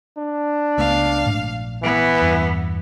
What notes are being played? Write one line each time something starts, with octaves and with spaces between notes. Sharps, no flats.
D4
C#2 A3 B3 F5
A#1 G#2 A3
E3 B3
E2 G2